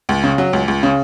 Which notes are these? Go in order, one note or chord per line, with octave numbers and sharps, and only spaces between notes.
C#2
C#3
F#3
C#2
C#2
C#3